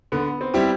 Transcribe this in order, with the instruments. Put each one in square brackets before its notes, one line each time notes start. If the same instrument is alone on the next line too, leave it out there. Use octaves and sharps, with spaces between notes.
[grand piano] D3 [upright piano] B3
[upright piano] C4
[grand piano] G3 C4 E4 G4